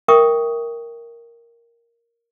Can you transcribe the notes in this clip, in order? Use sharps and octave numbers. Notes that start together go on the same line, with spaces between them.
A#4 E5 G5 C#6 D#6